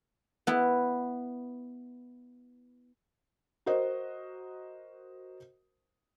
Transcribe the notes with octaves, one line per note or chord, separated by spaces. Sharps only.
B3 E4
F#4 A#4 C5 D#5